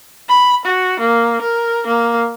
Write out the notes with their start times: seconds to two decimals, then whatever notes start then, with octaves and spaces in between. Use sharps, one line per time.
0.29 B5
0.66 F#4
1.00 A#3
1.42 A#4
1.87 A#3